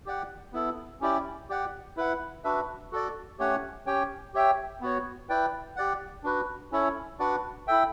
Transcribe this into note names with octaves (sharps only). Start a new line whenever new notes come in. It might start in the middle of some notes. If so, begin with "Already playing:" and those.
G4 D5 F#5
B3 E4 A4
C#4 E4 G4 D5
G4 D5 F#5
E4 B4 F#5
D4 F#4 B4 E5
F#4 A4 D5
A3 C#4 G4 C#5 F#5
C#4 G4 C#5 G5
G4 C#5 E5 G5
B3 F#4 C#5
E4 B4 D5 G5
G4 D5 F#5
D4 F#4 B4
C#4 E4 A4 C#5
D4 F#4 B4 D5 F#5
E4 A4 E5 G5